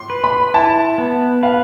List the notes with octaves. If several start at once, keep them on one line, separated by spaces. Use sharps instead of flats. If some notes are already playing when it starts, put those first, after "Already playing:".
Already playing: C6
B4
B5
E4 A5
B3
B4 F5